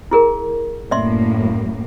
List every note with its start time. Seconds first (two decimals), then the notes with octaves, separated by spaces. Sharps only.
0.11 E4 G#4 A#4
0.91 F#2 A2 A#3 D5 E5 C6